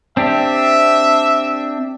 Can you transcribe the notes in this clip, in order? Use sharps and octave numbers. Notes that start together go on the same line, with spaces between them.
C4 D4 G4 E5